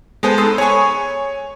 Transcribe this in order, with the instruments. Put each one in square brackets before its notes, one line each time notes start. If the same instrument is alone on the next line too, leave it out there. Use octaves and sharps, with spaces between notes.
[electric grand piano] G#3 B3 C5 [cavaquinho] A4 G#5 D#6
[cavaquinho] D#4 B4 C6 [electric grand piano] A4 D#6
[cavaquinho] G#4 B5 C#6 [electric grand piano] C#5 G#5